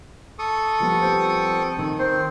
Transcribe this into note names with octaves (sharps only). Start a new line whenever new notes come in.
A4 C#6 D#6
F3 G3 B3
C4
D#3
C4 C5